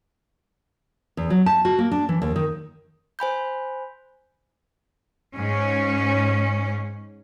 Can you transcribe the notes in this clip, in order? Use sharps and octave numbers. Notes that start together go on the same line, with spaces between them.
E2
F#3
A5
F#4
A#3
D4
E3
D#2
D#3
C5 G#5 B5 G6
G#2 C#4